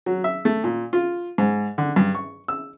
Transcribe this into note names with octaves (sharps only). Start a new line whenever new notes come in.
F#3
E5
A3
A#2
F4
G#2
D3
G2
C#6
E6